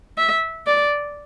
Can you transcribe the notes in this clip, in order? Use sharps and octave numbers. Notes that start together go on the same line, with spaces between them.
E5
D5